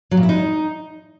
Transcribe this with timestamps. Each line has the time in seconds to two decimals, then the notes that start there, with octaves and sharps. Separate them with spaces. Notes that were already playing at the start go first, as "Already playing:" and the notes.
0.11 F#3
0.17 A#2
0.23 E4
0.29 D#4